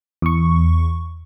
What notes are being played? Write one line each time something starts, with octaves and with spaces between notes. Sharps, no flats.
E2 C#6